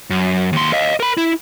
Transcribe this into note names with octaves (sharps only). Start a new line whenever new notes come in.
F#2
D#2 C6
D#5 F5
A#4 B5
E4